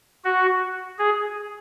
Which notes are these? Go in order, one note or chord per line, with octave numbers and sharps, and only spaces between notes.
F#4
G#4